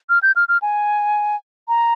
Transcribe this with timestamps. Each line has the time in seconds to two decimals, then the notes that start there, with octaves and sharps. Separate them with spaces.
0.09 F6
0.23 G6
0.36 F6
0.48 F6
0.62 G#5
1.68 A#5